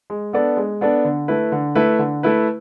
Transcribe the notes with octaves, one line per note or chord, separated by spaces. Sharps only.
G#3
B3 D4 A4 D5
G#3
B3 D4 A4 D5
D3
A3 E4 B4
D3
A3 E4 B4
D3
A3 E4 B4